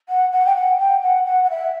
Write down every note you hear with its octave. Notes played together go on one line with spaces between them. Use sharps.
F#5
F#5
G5
F#5
G5
F#5
F#5
F#5
E5